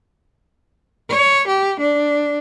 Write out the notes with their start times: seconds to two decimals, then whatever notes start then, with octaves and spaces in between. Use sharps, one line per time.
1.10 C#5
1.48 G4
1.80 D4